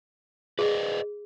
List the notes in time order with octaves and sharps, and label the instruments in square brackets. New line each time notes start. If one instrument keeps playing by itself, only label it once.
[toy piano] G#4 [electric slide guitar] B4 D5 D#5